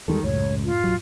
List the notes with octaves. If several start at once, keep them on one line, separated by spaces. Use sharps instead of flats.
E2 D#3 G3 G#3 A4
C#2 F#2 A2 C#5
F4
B1 F#3